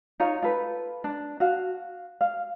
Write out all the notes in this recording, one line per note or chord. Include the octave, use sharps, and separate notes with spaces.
D#4 F4 C#5 F5
F4 A4 B4
D4
F#4 F5
F5